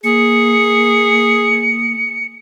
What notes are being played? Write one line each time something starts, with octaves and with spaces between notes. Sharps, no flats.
A#3 G#4 C#7